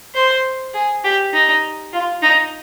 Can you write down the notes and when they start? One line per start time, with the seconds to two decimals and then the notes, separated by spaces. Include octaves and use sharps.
0.15 C5
0.74 G#4
1.04 G4
1.33 D#4
1.93 F4
2.22 D#4